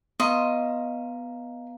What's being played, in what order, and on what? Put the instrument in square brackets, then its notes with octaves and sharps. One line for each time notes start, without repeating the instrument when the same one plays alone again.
[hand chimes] B3 F5 A#5 [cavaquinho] D#5 C6